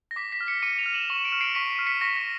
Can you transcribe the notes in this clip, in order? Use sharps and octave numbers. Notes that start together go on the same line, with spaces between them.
A#6
D6 B6
B6
F6
B6 C#7
D6 C#7 D#7
D#7 F7
F6
E7 F#7
C#6 E7 F#7
D7 E7
F6
C7 D7
C#6 B6 C#7
C7
F6
B6 C#7
C#6 A#6
A#6